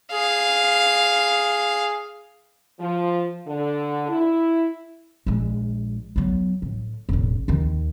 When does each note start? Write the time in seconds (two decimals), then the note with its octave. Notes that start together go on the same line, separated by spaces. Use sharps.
0.12 G#4 F5
2.80 F3
3.46 D3
4.09 E4
5.26 A#1 G#3
6.16 F#3 B3
6.62 A2
7.09 E1 A1
7.48 D#2 D#3